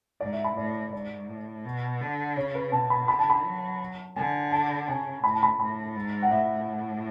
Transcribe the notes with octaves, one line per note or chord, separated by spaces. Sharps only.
G#2 D5
E5
B5
A2 D5
G#2 D5
A2
B2
D3
C#3 C#5
B4
B2 A5
B5
D3 B5
A5
B5
F#3
D3 G#5
A5
C#3 G#5
A2 B5
A5
B5
A2 B5
G#2
F#5
A2 E5